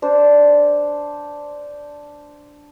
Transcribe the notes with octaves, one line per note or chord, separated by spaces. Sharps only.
D4 C5